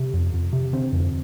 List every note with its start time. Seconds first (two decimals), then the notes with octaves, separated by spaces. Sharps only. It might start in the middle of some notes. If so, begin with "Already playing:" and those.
Already playing: C3
0.14 F2
0.34 F2
0.53 C3
0.73 D3 C4
0.92 F2